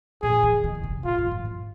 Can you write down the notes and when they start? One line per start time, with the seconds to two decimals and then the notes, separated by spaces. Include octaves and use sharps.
0.22 A#2 G#4
0.43 D#3
0.64 D#3
0.75 D#3
0.83 C3
1.04 A#2 F4
1.18 G#2
1.26 A#2
1.31 G#2
1.45 G#2